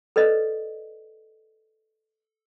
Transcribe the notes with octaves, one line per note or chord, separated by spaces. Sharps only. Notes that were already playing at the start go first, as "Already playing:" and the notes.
A4 B4 D5 D#5